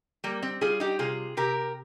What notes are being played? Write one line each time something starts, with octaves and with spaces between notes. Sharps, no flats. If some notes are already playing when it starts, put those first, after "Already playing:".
G3 A#3
C4
G3 F4 G#4
D#4 G4
C3 F4 G#4
C3 G4 A#4